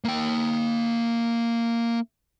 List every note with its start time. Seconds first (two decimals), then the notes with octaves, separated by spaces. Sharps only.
0.04 A#3 G5